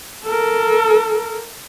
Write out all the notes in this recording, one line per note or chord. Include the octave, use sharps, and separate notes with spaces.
A4 A#4